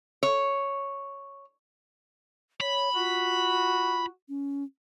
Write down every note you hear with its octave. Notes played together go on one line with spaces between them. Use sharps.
C#5
C#5 B5
F4 F#4
C#4